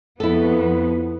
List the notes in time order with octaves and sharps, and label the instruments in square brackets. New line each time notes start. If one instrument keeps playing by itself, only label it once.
[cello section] F2 F3 B3 [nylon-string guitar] E4 A4